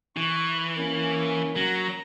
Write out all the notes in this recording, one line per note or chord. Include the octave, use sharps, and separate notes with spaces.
E3 C#6
A#3 C#4
F#3 A#5